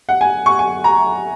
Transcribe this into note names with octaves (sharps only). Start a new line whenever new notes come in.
F#5
G#5
C#6
G#5
A#5